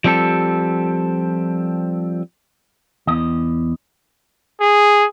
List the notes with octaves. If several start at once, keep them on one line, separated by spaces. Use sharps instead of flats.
F3 G3 C4 G4 A4
E2 D#5
G#4